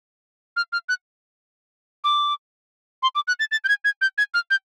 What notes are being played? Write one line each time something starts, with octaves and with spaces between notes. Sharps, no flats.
F6
F6
F#6
D6
C6
D6
F#6
A6
A6
G6
G#6
G#6
G6
G#6
F6
G6